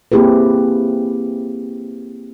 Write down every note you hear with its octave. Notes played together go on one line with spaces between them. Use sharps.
A#3 C4 E4 G4 G#4 B4